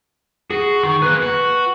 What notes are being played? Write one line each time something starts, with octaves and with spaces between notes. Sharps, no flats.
F#4 G#4
D#3 C#6
A#3 G#4 B4 F#6
F#4